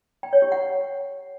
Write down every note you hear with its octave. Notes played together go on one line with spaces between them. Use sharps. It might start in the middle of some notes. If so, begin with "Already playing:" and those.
G5
C#5
G4
F#5